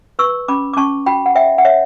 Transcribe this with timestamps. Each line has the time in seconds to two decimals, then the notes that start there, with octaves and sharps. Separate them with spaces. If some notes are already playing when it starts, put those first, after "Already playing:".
0.19 B4 C#6 E6
0.48 C#4 B5 D6
0.73 D6
0.77 C#4 A5 C#6
1.06 F#4 G5 B5
1.26 F#5
1.35 C#5 E5 G5
1.58 F#5
1.65 C#5 E5